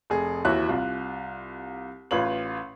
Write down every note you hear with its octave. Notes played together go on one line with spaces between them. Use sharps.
F1 G#4
D#2 E3 F#4 E5 F#6
C2 F4
A1 F4 B4 C#5 F#7